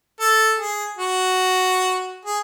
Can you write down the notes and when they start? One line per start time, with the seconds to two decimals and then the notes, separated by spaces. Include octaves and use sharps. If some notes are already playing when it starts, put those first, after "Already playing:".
0.20 A4
0.59 G#4
0.97 F#4
2.26 G#4